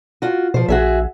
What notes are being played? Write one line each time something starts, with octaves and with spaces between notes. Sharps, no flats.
F4 F#4
B2 F3 C5
A#1 F#4 G#4 E5